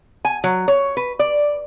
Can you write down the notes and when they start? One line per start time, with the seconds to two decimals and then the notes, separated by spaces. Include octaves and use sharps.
0.25 G#5
0.44 F#3
0.68 C#5
0.97 B4
1.19 D5